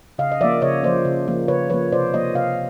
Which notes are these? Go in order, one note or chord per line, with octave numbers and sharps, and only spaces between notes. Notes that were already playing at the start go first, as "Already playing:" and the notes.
C#3 D#5 F5
D#5
F3 A#3 D5 E5
C#3 C#5 D#5
F3 A#3 C5 D5
C#3
F3 A#3
C#3 B4 C#5
F3 A#3 B4 C#5
C3 C5 D5
F3 A#3 C#5 D#5
C3 D#5 F5